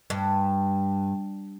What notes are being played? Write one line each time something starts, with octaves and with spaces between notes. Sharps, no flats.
G2